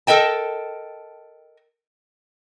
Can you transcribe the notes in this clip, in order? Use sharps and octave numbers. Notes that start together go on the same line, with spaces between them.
A4 A#4 D#5 G5 A5